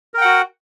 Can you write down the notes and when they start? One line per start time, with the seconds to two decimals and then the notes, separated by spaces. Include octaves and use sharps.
0.14 A#4
0.18 G5
0.21 F#5
0.25 F#4